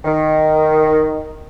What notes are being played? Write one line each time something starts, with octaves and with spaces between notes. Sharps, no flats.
D#3